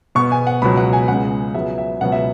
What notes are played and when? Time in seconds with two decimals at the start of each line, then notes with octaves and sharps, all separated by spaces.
0.15 B2 B3 C#6
0.31 G#5
0.47 F#5
0.62 C#2 B2 F#3 B5
0.77 F#5
0.93 G#5
1.08 C#2 C#3 G#3 F#5
1.54 C#2 C#3 F#3 B3 E5
1.78 E5
2.01 C#2 B2 F#3 B3 F#5
2.12 E5